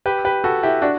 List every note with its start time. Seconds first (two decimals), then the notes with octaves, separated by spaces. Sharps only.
0.06 G4 B4
0.25 G4 B4
0.44 F#4 A4
0.63 E4 G4
0.82 D4 F#4